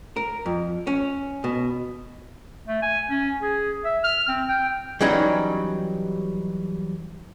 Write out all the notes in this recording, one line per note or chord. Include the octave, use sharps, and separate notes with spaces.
A#4
F2
C#4
B2
A3
G#5
C#4
G#4
E5
F6
C4
G5
E3 F#3 G3 C#4 D#4